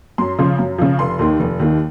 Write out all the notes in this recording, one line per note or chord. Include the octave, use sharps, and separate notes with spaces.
F#2 C6
C#3 F3
F#2
C#3 F3
F1 C6
D#2 D#3
F1
D#2 D#3